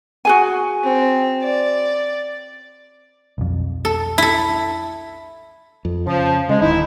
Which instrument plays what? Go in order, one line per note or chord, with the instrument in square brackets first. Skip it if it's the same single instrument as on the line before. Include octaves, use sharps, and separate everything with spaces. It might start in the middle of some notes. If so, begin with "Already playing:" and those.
[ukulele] F#4 G#4 G#5
[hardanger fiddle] C4
D5
[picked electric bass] B1 F2
[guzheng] A4
E4 A4
[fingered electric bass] F2
[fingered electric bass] C#3 [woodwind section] F3
[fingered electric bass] C#3 [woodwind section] G#3
[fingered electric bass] D1 G#1 D#3 [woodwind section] D#4 E4